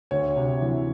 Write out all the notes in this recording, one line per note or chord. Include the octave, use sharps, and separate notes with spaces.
D2 C#5
C3
E3